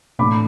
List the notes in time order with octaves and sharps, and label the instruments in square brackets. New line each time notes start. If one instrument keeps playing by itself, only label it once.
[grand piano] A2 E3 A3 D4 B5 D6